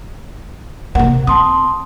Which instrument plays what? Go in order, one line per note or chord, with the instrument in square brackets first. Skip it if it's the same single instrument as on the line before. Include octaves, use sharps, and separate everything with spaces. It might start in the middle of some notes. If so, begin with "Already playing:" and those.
[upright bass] C3 A#3 [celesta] F#5
[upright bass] C4 [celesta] A5 C6 D#6